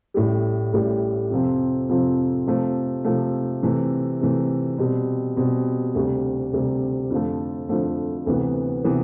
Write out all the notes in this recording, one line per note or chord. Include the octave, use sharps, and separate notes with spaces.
A1 A2 G3
A1 A2 G3
F2 C3 F3 C4
F2 C3 F3 C4
C3 F3 A3
C3 F3 A3
C3 E3 A3
C3 E3 A3
B2 G3 C4
B2 G3 C4
D2 C3 G3
D2 C3 G3
F2 D3 F3 A3
F2 D3 F3 A3
D2 C3 E3 B3
C3 E3 B3